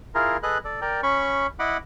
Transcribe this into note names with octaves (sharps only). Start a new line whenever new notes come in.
E4 F4 G#4 A#4
G#4 A4 B4 D#5 F#6
A4 D5
A#4 D5 G5
C#4 B5 C#6
E4 D#5 F#5 B5 D6